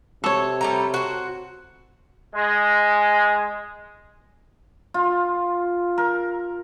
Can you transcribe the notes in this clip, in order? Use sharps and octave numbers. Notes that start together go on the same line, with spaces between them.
C3 A4 C#5
G3 A3 A#5
F#4 C5
G#3
F4
A#4